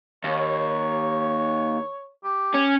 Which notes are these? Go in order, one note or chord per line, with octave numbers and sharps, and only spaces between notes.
D#2 C#5
G4
C#4